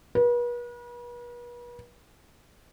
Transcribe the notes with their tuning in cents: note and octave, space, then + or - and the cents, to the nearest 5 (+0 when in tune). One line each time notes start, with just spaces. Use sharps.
B4 -40